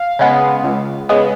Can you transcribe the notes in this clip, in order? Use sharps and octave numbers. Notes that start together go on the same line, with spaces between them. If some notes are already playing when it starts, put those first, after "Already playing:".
Already playing: F5
C#3 G#3 B3
C#2
C#3 G#3 B3